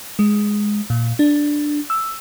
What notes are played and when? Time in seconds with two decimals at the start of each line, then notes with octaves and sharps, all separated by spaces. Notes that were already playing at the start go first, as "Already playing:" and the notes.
0.19 G#3
0.90 A#2
1.19 D4
1.90 E6